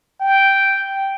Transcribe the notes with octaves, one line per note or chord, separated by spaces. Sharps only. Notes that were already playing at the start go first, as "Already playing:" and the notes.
G5